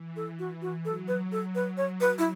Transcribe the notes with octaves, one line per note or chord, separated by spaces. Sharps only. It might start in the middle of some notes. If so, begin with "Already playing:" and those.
Already playing: E3
A4
F#4
F#4
F#3 A4
B4
A4
B4
C#5
B4
E4